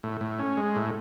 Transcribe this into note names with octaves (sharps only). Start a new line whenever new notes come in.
A2
A2
C#4
G#3
A2